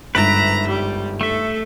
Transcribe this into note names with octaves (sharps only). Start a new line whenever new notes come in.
G1 G#2 B4 E5 A#5 D7
G3
A3 A4 E5